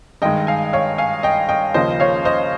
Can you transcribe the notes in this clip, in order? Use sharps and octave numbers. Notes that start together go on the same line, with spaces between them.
G2 D#3 G#3 D#5 G5
F5 G#5
C#5 F5
F5 G#5
D#5 G5
D#5 G5
D#2 C#3 F3 A#3 C5 D#5
C#5 F5
C5 D#5